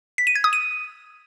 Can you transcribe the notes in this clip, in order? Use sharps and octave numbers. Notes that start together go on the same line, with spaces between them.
B6
D#7
G#6
D#6
D#7